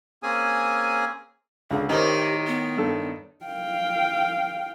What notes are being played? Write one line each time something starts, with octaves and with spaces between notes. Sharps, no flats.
A#3 C4 C#4 G#4 G#5 D#6
C#2 D3 G#4
A2 D#3 D#4 G4 A#4 C5
B3
G2 A4
F5 G5